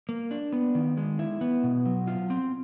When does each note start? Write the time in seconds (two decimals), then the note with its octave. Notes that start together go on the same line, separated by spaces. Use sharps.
0.09 A#3
0.31 D4
0.53 B3
0.75 D#3
0.97 G#3
1.19 E4
1.41 B3
1.64 B2
1.86 F#3
2.07 F4
2.30 C4